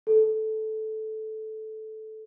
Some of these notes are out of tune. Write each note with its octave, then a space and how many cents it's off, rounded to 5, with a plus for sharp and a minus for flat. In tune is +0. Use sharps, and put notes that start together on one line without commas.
A4 -10